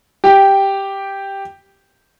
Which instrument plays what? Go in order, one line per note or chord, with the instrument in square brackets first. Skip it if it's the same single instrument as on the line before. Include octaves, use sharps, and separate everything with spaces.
[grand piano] G4 G5